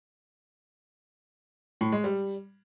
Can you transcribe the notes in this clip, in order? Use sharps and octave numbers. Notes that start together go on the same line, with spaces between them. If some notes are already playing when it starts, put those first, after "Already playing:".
A2
G#3
G3